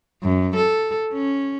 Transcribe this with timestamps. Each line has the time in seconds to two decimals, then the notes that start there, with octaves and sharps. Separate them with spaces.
0.23 F#2
0.56 A4
1.13 C#4